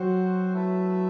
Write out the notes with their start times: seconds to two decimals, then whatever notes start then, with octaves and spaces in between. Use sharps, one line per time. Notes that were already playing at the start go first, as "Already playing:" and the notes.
Already playing: F#3 C4 F#4 C5 F#5
0.52 A3 E4 B4 E5 A5